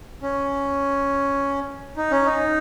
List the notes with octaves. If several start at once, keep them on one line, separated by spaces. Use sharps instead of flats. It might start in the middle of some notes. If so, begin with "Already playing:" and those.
C#4
D#4
C#4
D#4